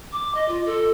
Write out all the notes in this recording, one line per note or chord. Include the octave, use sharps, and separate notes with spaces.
D6
D#5
F4
A4